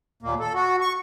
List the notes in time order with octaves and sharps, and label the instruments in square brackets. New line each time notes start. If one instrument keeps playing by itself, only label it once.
[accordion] D#2 A#2 A#3
A4
F#4
C#6